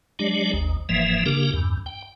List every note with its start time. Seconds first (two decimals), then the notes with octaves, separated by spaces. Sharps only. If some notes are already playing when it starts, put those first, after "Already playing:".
0.19 F#3 G#3 D4 G4 D5
0.53 G#1 D#2
0.89 F#1 G#2 E3 F3 A#3 E5
1.26 C#3 A#3 D4 G4 A#4
1.54 E2 G2
1.86 G5